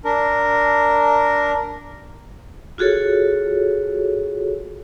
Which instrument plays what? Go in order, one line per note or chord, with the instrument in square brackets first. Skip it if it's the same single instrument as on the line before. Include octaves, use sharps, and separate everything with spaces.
[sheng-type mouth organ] D4 A#4
[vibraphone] F4 F#4 G#4 A4 C#5